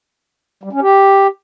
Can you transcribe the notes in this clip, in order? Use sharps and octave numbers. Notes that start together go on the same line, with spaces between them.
G3
C#4
G4